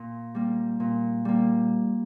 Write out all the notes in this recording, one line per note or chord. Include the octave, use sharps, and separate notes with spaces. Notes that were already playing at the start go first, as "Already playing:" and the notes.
Already playing: A#2
G3 A#3
A#2
G3 A#3